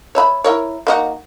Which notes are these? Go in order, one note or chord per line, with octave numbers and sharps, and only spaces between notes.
C#5 E5 B5
E4 A#4 C#5
A#3 D#4 F#4